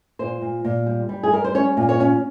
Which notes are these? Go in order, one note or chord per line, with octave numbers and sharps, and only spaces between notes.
A#2 C5
A#2
A#2
G3
G3
G#4
G3 A#4
C5
C#4 C#5
A#2
C#5
C#4